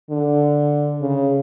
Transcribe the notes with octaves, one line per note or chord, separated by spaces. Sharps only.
D3
C#3